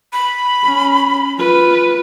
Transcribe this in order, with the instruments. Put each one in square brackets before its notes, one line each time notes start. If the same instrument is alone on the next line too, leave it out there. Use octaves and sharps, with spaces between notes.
[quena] B5
[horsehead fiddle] C#4
F4 B4